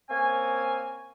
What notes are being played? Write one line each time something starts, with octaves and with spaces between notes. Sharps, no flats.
A#3 C4 C#4 G#5